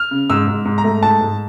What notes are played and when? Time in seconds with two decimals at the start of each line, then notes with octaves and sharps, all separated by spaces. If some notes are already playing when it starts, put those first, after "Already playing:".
Already playing: F6
0.11 C#3
0.30 G#2 E6
0.47 G#2
0.65 G#2
0.78 A#5
0.84 A3
1.02 G#2 A5
1.21 G#2